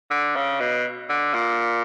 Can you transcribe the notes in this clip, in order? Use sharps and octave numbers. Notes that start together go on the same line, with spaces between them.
D3
C#3
B2
D3
A#2